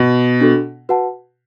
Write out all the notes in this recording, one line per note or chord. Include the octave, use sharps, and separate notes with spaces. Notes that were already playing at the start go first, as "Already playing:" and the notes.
Already playing: B2
D4 F#4 A4
F#4 B4 F#5 A5